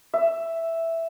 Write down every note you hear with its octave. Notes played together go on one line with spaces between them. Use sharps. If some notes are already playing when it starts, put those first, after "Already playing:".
E5